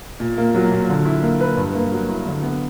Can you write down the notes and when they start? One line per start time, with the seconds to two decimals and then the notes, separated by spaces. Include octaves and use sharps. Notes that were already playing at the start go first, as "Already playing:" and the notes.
0.20 A#2
0.38 A#3
0.55 F#3
0.71 A#2
0.89 D3
1.05 E4
1.23 A#3
1.41 B4
1.57 G2
1.75 A#3
1.92 F#3
2.09 E4
2.26 D3
2.42 B3